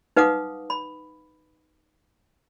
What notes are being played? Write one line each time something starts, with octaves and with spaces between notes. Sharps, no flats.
D#4 B4 F5 F#5 D6 D#6
B5